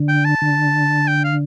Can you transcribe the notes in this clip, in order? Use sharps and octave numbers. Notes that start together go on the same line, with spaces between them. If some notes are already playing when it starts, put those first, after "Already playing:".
Already playing: D3
G5
A5
D3
G5
F5